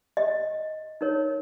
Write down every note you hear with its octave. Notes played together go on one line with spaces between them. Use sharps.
D#5
D#4 A#4 C#5